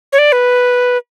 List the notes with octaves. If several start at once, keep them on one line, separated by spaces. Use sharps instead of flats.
C#5
D5
B4